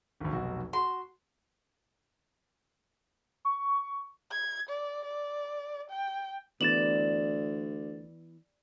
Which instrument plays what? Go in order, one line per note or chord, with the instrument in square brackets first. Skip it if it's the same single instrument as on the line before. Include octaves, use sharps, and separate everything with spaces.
[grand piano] G#1 D2
F1 B1 F#4
[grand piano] F#4 [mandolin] C6
[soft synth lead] C#6
[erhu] G#6
D5
D5
G5
[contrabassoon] D2 [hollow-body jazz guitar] E3 B3 [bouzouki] D5 [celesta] A6 E7 F#7